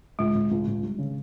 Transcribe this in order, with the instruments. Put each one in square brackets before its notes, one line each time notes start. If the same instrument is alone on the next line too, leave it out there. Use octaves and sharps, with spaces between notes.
[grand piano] C#2 [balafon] G#3
[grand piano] C#2
C#2
C#2
G3
C#3